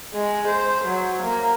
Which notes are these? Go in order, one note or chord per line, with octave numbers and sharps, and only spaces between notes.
G#3
C5
F#3
A#3